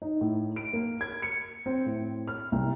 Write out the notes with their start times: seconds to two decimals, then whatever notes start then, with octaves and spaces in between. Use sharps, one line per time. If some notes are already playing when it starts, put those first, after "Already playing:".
0.02 D#4
0.21 A2
0.56 D7
0.73 A#3
1.01 G#6
1.22 C#7
1.66 C4
1.86 A2
2.28 F6
2.52 C2